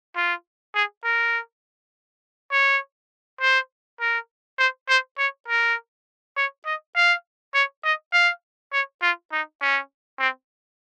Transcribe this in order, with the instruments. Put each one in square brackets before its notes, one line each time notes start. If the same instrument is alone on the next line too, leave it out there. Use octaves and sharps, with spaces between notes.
[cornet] F4
G#4
A#4
C#5
C5
A#4
C5
C5
C#5
A#4
C#5
D#5
F5
C#5
D#5
F5
C#5
F4
D#4
C#4
C4